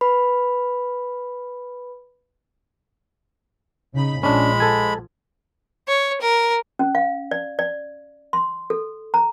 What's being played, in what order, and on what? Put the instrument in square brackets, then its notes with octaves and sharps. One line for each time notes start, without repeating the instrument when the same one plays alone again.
[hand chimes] B4 B5
[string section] C#3 D#4 B5
[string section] A#1 F3 [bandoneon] G#3 B5 [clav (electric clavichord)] C#4 D4
[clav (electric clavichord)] A4 G#5
[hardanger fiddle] C#5
A#4
[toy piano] C#4
F5
D5
D5
C6
A4
A#5